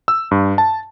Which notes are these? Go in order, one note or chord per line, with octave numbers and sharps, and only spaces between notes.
E6
G2
A5